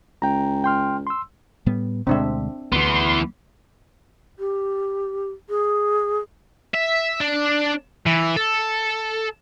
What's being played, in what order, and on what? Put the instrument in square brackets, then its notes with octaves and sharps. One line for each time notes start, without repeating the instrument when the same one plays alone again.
[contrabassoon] C#2 [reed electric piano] G5 A#5
[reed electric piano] G5 C6 F6
C6 E6
[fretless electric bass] A2 G3 B3
[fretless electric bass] D2 B2 G#3 [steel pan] C4 D4 E5
[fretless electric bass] D2 [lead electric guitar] E3 B3 [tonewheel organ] C6
[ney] G4
G#4
[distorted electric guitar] E5
D4
E3
A4